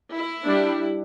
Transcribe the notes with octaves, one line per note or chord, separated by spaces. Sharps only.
E4
G3 D4